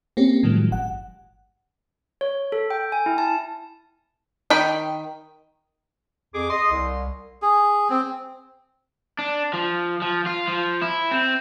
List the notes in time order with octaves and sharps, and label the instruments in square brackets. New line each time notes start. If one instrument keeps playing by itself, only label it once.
[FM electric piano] A#3 C4 C#4 G4
A2 D#3 F3 F#3 G#3
G1 F#5
[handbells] C#5
A4
G5
G#5
E4
A5
[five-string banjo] D#3 G5 B5
[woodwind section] F2 D6 [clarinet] G#4
[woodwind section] D#5 [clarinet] C6
[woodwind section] C2
[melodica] G#4
C4
[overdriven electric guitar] D4
F3
F3
F4
F3
E4
C4